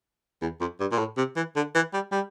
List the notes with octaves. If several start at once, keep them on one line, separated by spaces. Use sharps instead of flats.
E2
F2
G2
A#2
A2
C3
E3
D3
E3
G3
G3